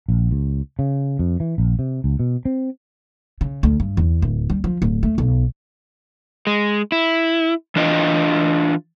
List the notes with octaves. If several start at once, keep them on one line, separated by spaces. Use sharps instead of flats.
A#1
C#2
C#3
F2
E3
A#1
C3
C#2
B2
C4
C#3
D2
G2
E2
D1
G3
F3
D1
A3
B1
G#3
E4
E3 D4 F4 D#5 G5